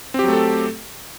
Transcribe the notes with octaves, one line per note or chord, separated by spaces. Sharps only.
F#3 A3 C4 G4 A4